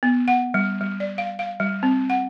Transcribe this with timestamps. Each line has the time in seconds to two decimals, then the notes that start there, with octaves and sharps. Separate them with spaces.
0.03 B3
0.28 F#5
0.54 G3
0.81 G3
1.00 D5
1.18 F5
1.39 F5
1.60 G3
1.83 C4
2.10 F#5